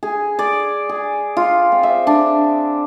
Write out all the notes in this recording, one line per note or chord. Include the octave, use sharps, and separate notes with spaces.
G#4
D5
G#4
F4
C4
E5
D4